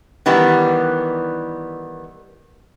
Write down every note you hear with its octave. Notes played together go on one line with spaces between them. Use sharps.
D#3 E3 G3 B3